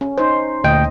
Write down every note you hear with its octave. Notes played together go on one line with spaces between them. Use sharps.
C#4
D#4 C5
D2 A#2 D#5 G5